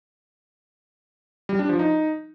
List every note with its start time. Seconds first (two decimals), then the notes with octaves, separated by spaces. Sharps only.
1.49 G3
1.59 D4
1.69 F3
1.79 D#4